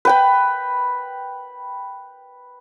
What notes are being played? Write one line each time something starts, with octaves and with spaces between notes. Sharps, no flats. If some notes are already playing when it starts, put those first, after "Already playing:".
B4 G5 B5